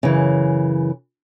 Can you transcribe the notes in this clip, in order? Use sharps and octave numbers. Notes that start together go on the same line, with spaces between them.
F#2 C#3 E3